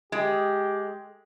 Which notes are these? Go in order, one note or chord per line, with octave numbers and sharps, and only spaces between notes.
G#3 G4